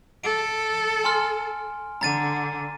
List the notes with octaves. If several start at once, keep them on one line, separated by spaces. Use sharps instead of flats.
A4 D7
G#5 C6 F6
D3 A#5 A6 D#7